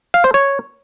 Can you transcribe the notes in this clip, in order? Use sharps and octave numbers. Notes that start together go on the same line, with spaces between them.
F5
C5
C#5